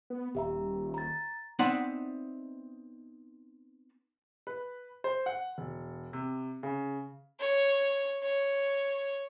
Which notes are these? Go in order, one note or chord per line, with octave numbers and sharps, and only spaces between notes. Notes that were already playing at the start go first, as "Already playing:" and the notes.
B3
D#1 G4 E5 A#5
A#5 A6
B3 C4 D#4 D5 E5 F#5
B4
C5
F#5
E1
C3
C#3
C#5
C#5